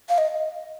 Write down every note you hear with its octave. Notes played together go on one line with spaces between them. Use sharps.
F5
D#5